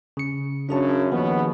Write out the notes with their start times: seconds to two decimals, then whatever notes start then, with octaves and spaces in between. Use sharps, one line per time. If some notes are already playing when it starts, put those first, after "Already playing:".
0.17 C#3 C#7
0.69 F#2 C#3 D4 G#4 A5
1.12 D#2 B2 D#3 F3 B3